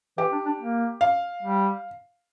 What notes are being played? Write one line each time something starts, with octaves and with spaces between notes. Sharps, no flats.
E3 G4
D4
D4
A#3
F5
G3